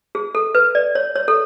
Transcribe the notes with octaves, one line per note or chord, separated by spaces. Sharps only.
G#4
A4
B4
D5
C#5
C#5
A4